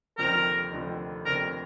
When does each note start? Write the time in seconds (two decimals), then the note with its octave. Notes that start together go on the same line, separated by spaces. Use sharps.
0.18 F1 D#2 D3 F3 C4 A#4
0.72 F1 D#2 D3 F3 C4
1.25 F1 D#2 D3 F3 C4 A#4